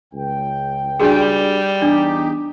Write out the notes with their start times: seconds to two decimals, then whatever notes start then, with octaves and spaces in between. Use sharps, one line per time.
0.14 C#2 G5
1.00 G3 D4 F#4 G#4
1.82 E2 D4 D#4 G4